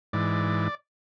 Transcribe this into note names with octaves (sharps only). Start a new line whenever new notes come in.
G#2 E3 D5